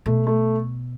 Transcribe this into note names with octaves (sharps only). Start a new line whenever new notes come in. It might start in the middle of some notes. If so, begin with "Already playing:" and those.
B2 A3
A3